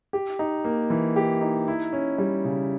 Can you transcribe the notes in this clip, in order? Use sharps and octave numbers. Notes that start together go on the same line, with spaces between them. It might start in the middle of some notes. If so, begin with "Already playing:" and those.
G4
D#4
A#3
E3
G4
D#4
E4
C#4
G3
C#3